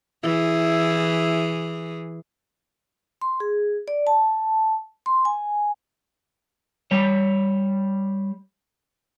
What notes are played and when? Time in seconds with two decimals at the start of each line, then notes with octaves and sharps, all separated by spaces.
0.23 E3 E4 G#4
3.22 C6
3.40 G#4
3.88 D5
4.07 A5
5.06 C6
5.25 G#5
6.91 G3 C#5